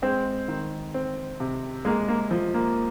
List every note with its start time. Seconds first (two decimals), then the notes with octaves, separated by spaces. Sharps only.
0.02 G#3 C4
0.48 D#3
0.94 C4
1.40 C3
1.85 G#3 A#3
2.08 A#3
2.31 F3
2.54 A#3